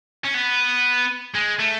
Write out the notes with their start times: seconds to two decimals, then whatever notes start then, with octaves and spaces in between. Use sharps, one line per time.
0.25 C#4
0.34 B3
1.34 G#3
1.59 A3